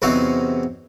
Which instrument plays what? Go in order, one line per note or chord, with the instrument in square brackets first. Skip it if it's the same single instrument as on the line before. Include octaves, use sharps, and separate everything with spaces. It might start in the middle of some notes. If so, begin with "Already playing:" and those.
[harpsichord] E2 C3 F#3 D#4 F#4 F5